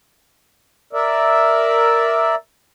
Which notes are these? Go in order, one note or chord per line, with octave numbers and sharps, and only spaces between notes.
A#4 D5 E5